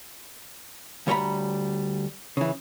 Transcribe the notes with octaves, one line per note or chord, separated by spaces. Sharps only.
D2 G3 C#5 G5 A#5 B5
C#3 E3